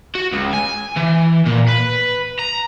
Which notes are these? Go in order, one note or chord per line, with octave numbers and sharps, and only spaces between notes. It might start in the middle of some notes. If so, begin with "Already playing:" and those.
F#4
C#2
G#5
E3
A#2
B4
A#5